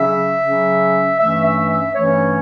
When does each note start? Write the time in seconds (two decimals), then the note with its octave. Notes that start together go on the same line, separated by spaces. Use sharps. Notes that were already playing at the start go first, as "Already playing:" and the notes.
Already playing: C#3 F#3 C#4 E5
0.42 C#3 F#3 C#4
1.18 G2 E3 A3 C#4 E5
1.44 E5
1.69 E5
1.94 G2 E3 A3 C#4 C#5